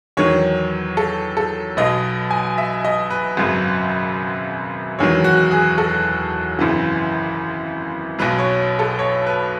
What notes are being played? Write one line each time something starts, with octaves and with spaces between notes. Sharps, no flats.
E2 D#3 F#3 C#5
A4
A4
B1 B2 F#3 D#5
G#5
E5
D#5
B4
G#1 F#2 C#3 F#3
E1 E2 D#3 F#3 C#5
F#4
G#4
A4
G#1 F#2 C#3 E3
B1 B2 F#3 B4
C#5
A4
C#5
B4